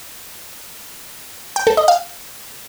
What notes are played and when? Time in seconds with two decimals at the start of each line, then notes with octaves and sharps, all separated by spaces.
1.56 G5
1.67 A4
1.77 D#5
1.88 F5